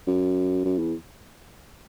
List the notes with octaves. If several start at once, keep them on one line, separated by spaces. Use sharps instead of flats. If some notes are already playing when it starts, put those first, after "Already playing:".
F#2
F#2
E2